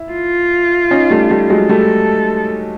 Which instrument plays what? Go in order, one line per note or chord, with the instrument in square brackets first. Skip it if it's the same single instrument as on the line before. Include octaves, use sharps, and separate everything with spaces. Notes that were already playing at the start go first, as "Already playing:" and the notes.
Already playing: [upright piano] E4
[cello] F4
[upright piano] C#4 D#4
G3 A3
G3 A3
F#3 G#3
[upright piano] G3 A3 [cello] A4